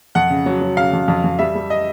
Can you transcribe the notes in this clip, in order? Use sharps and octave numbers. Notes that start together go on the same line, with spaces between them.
F2 F#5
C#3
F#3
F#3
C#3 F5
F2
F2
F2
G3 E5
G3
D#5